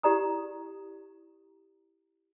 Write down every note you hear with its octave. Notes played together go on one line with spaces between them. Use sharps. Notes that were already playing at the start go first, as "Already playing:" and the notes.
E4 G4 D5 A#5 D#6